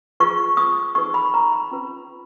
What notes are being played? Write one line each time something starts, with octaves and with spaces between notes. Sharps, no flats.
F4 G#4 B4 C#6
D#6
D#4 G#4 B4 C#6
B5
A#5
B5
C#4 F4 B4